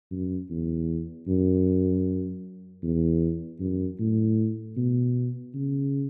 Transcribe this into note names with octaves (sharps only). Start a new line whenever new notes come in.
F#2
E2
F#2
E2
F#2
A2
B2
C#3